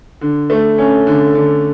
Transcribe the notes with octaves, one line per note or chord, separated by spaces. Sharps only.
D3
A3
C#4
D3
D3